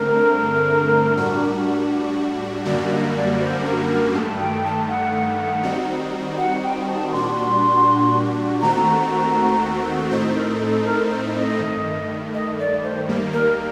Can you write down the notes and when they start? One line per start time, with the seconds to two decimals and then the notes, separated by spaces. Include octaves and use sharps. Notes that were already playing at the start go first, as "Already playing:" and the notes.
Already playing: G2 D3 A3 C4 A#4
1.17 A2 G3 D4 F#4
2.65 F#2 D3 G3 A#3 F#4 D5
2.90 D#5
3.15 D5
3.40 C5
3.65 A#4
3.90 A#4
4.14 G2 D#3 A3 A5
4.40 G5
4.64 A5
4.88 F#5
5.63 D#3 G3 C4 D#4 F#4
6.37 F#5
6.63 G5
6.87 A5
7.12 A#2 G3 D4 F#4 C6
8.61 D#2 D#3 A3 C4 F#4 A#5
10.10 A2 A3 C4 D#4 C5
10.35 A#4
10.60 A4
10.84 A#4
11.09 C5
11.35 D#5
11.59 G2 D#3 A3
12.34 D#5
12.59 D5
12.83 C5
13.08 D#2 D#3 G3 A#3
13.32 A#4